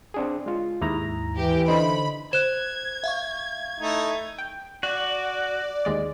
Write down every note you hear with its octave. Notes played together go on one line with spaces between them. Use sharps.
C4 D4 G#4
G#3 F4
D#2 G#2 E4 A#5
E3 G4
D3 D#4 C5 B5
C5 F#6 G#6 E7
E5 F5 C#6
A3 D#4 E4
G5
F#4 D5
D#2 G#3 D5